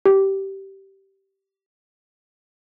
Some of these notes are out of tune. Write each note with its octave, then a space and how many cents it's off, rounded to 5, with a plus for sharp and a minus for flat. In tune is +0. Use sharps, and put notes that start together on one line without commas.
G4 -15